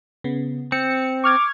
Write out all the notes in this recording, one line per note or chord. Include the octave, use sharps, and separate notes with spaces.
C#3 B3
C4 C#7
C#6 D6 F6 G#6